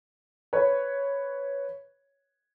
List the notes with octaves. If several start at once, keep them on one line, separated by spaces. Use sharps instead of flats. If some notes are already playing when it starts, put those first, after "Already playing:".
B4 C#5